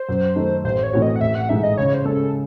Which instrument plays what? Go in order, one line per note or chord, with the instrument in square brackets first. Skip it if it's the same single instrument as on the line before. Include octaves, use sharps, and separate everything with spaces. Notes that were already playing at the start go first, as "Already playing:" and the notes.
Already playing: [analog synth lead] C5
[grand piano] F#2
D#3 A3 D#4
[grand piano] A1 [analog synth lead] C5
[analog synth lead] C#5
[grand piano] A2 E3 C4 F#4
[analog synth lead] D#5
F#5
[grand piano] A1 [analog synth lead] E5
[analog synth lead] F#5
[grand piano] G#2 E3 G#3 D#4 [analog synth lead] E5
[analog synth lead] D#5
[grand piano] C#3 [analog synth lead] C#5
[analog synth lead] C5
[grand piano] G#3 C#4 [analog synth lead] A4